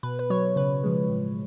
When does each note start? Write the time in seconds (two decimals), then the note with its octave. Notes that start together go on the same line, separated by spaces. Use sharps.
0.03 B2 B4
0.19 B4
0.30 F#3 C#5
0.56 C#3 B4
0.83 F3 G#3
1.09 A2